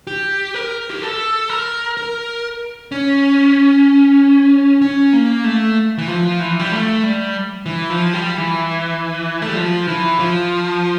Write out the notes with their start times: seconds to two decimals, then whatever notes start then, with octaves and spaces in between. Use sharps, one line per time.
0.07 G4
0.54 A#4
0.90 G4
1.02 A4
1.49 A#4
1.97 A#4
2.92 C#4
4.82 C#4
5.13 A#3
5.44 A3
5.99 E3
6.08 F3
6.40 E3
6.59 G3
6.72 A3
7.03 G3
7.66 E3
7.90 F3
8.14 G3
8.37 E3
9.42 A3
9.49 G3
9.56 F3
9.88 E3
10.19 F3